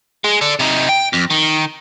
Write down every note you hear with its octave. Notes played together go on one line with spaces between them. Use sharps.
G#3
D4 A4
C3 D#4
G5
F2
D#3